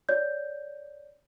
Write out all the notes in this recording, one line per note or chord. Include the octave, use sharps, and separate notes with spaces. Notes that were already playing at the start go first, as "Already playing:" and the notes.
C#5 D5 G6